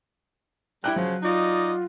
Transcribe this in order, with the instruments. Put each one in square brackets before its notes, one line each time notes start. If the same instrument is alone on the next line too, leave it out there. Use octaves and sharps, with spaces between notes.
[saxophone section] G3 [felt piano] E4 G5 F#6
[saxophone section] C#3 F3 [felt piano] F#3
[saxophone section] D#4 D5 D#5 [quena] F4